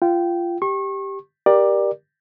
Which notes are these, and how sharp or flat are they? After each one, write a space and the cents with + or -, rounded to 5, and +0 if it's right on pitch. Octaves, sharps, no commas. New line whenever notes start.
F4 -20 G5 -20
G4 +0 C#6 -35
G4 +0 A#4 +25 D5 +15